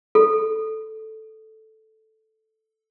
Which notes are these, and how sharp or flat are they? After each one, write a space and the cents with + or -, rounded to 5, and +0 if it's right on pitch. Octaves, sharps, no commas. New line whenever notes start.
A4 -5